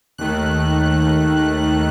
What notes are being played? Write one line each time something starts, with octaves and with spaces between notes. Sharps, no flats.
D#2 D#3 A3 F#6